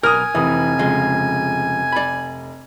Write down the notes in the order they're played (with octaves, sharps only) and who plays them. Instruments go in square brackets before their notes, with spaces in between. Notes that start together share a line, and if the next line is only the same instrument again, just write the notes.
[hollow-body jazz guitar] B1 A#4 [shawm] G#5 [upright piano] D#6 F6
[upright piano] F1 D#6 [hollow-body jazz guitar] E3
[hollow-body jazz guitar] C#3 F3 G#3
D5 B5